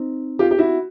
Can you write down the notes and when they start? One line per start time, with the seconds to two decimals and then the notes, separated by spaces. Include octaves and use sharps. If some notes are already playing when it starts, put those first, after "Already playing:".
Already playing: C4 D#4
0.39 F4 G4
0.51 G4
0.59 E4 F#4